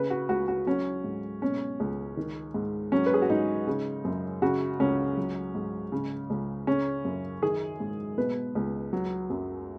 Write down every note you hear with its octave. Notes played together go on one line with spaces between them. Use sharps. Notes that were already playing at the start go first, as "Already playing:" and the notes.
Already playing: C#3 B4
F#4
C#2 F#4
F#4
F#3 C#4
G#2
B2 C#4
C#2
D#3
G#2
F#3 C#4
B4
G#4
F#4
G#2 D#4
C#3
F#2
C#3 F#4
C#2 C#4
F#3
G#2
C#3
C#2
C#3 C#4
F#2
D#3 G#4
G#2
B2 B4
C#2
F#3
F#2